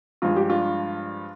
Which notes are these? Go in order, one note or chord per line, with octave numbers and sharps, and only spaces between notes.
G2 F3 G#3 F4
G4
D4 F4